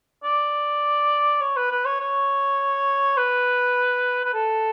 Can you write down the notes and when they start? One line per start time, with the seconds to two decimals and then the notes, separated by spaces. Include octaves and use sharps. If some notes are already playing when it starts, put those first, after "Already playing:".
0.24 D5
1.41 C#5
1.57 B4
1.71 B4
1.85 C#5
2.00 C#5
3.17 B4
4.24 B4
4.34 A4